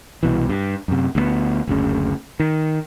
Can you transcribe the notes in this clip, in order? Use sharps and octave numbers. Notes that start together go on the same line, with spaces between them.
C2 B2 E3
G2
F#2 C3
D2 E3 B3
F#1 D2 C#3
D#3